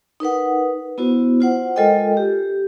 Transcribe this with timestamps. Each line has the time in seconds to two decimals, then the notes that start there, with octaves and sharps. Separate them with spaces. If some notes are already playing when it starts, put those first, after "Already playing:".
0.20 D#4 A#4 B4 F#5
0.98 B3 E4 F#4 C5
1.40 F4 C5 F#5
1.76 G#3 F4 A4 A#4 D#5 G5
2.17 G4